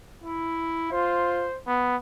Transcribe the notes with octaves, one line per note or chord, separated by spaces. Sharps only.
E4
F4 C5
B3